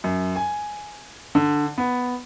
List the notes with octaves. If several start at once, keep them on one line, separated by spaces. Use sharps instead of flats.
F#2
G#5
D3
B3